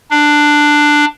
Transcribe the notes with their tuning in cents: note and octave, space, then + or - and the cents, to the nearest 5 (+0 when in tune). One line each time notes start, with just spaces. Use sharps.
D4 +10